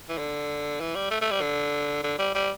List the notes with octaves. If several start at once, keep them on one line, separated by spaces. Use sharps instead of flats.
E3
D3
E3
G3
A3
A3
G3
D3
D3
G3
G3